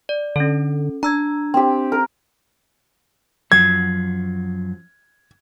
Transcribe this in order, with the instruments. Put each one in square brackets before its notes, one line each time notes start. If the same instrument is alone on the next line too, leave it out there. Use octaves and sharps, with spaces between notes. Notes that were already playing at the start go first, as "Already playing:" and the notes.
[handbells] D5
[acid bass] D3 [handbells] C#4 A4
[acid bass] D4 [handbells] A#5 E6 G#6
[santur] C4 G4
A#4
[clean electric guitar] F#2 F3 F#3 [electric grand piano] G#6